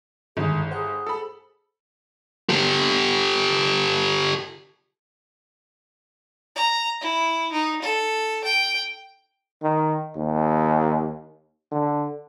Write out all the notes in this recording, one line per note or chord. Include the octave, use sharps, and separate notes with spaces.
G1 G#2 D#3 E4 G#4
G#4 C5 F#5 G5
A4 B5
G4 A4
A#5
E4
D#4
A4
G5
D#3
D#2
D3